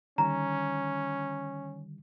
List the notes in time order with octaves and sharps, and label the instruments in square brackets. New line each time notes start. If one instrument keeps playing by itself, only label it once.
[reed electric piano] D3 D#3 G3 [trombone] C#4 [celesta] A#5